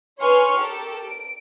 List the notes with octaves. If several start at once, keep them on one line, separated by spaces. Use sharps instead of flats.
B4 C#5 G#5 C6 C#6 F6
G4 A4 A#4
D7